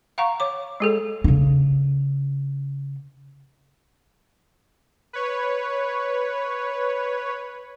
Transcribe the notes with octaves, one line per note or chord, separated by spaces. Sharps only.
F5 F#5 A#5 C#6
C#5 D6
G#3 G#4 A4
C#3 D4
B4 C#5